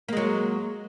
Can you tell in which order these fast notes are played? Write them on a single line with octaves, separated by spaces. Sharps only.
A#3 G#3 F#3